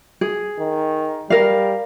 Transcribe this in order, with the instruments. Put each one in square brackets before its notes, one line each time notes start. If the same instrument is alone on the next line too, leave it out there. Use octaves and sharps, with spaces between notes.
[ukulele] G#4
[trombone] D#3
[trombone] G3 [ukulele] A#4 F5